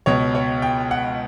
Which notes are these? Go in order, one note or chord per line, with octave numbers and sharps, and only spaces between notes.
C#2 B2 C#5
C#5
G5
F#5